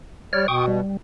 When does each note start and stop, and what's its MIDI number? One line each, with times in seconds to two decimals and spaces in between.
0.33 0.45 55
0.33 0.47 73
0.33 0.47 74
0.33 0.47 89
0.48 0.81 47
0.48 0.66 79
0.48 0.66 85
0.48 0.66 87
0.68 0.97 55